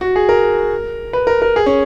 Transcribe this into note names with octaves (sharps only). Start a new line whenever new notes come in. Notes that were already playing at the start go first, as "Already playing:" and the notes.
F#4
G#4
A#4
B4
A#4
A#4
G#4
C#4